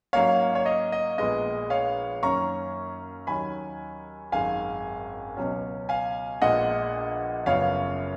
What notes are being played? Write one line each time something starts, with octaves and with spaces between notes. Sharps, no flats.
G#2 F#3 A#3 C#4 C#5 F5
C#5
D#5
D#5
A#1 A#2 G#3 B3 D#5
C#5 F5
F#2 D#3 A#3 C#4 A#5 C#6
D#2 D#3 F#3 C#4 G#5 B5
G#1 F#2 D#3 G#3 F5 G#5
C#2 B2 F#3 C#4
F5 G#5
A#1 A#2 G#3 B3 D#5 F#5
F#1 F#2 C#3 F3 B3 C#5 F5